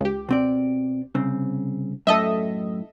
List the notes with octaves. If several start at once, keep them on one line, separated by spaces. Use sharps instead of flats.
C#2 G4
B2 C4 D5
C2 C#3 C4
F#2 A2 A4 D#5 E5